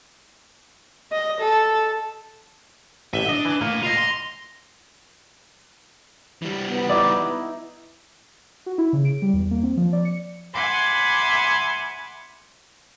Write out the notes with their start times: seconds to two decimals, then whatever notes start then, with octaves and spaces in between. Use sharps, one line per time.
1.12 D#5
1.41 A4
3.14 A1 E5 D#7 G7
3.29 D4 D#5
3.45 E3
3.61 A2 A#3
3.83 F4 D#5 A#6 C7 F7
3.97 C6
6.42 E3 G3
6.66 B3
6.89 D#4 E4 D5
8.66 F#4
8.78 E4
8.93 C#3
9.05 D7
9.22 G3
9.33 E2
9.51 A#3
9.63 C4
9.77 F3
9.93 D5
10.05 C#7
10.53 E5 F#5 G#5 B5 C6 D6